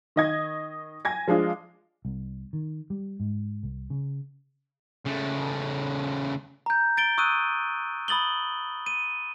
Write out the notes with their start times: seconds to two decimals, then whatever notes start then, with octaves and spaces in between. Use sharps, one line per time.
0.16 D#3 D#5 G#6
1.05 G#5 G#6 A#6
1.28 F3 G#3 D4 F4
2.05 C2
2.53 D#3
2.90 G3
3.20 G#2
3.63 C2
3.90 C#3
5.05 C#3 A3
6.66 A#5 G6
6.97 A6 D7 G7
7.18 C#6 D#6 E6 F#6 D#7
8.08 B5 D#6 A6 F#7 G7
8.86 D#7